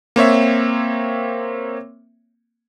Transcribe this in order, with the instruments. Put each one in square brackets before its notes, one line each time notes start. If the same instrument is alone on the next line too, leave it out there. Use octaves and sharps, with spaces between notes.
[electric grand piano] A#3 C4 C#5 E5